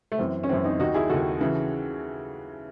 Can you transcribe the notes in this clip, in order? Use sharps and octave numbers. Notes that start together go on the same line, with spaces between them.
A3
F#2 E3 C4
C#4
F#2 E3 C4
C4 D#4
D#2 D#3 D#4 F#4
E4 G#4
D#2 D#3 F#4 A4
C#3 E3